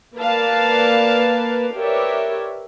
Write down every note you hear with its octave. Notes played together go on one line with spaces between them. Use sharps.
A#3 A#4 B4 D5 F5 A5
G4 A#4 B4 C#5 D5 E5